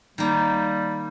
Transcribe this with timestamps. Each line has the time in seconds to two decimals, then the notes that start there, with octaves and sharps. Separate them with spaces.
0.18 D#3 G3 A#3